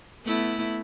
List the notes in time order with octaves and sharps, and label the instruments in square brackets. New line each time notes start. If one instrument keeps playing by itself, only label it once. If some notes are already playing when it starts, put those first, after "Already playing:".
[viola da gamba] A3 B3 E4